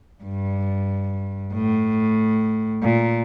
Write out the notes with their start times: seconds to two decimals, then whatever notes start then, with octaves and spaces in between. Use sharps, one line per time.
0.24 G2
1.53 A2
2.82 A#2